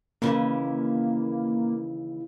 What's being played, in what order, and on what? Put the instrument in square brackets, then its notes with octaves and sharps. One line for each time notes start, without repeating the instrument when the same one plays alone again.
[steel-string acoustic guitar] D#2 C#3 E3 [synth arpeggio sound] A#3